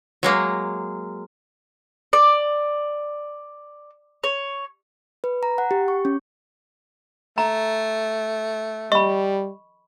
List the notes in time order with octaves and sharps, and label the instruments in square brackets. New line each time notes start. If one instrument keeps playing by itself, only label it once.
[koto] F#3 G#3 A#3
[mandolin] D5
C#5
[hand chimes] B4
A#5
F#5
G4
C#6
C#4
[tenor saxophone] A3 [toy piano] A#5
[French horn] G3 [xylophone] D#5 [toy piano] B5 C#6